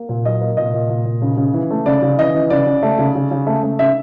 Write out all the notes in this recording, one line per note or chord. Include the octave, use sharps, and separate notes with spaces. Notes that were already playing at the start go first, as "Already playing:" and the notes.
Already playing: A#3
A#2
F#3 D#5
A#3
A#2 D#5
A#2
A#2
A#2
C#3
C#3
E3
A3
C#3 D5
C#3
E3 D#5
E3
C#3 D5
C#3
A3
C#3
C#3
C#3
A3
A3
C#3 E5